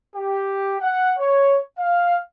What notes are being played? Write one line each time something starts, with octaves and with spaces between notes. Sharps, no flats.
G4
F#5
C#5
F5